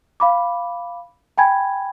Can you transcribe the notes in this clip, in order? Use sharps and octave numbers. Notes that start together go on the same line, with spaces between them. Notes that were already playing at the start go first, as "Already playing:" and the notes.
F5 B5 D6
G5 G#5 B5 G#6